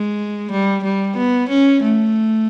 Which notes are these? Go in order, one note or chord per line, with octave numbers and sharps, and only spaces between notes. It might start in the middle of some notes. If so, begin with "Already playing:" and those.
Already playing: G#3
G3
G3
B3
C#4
A3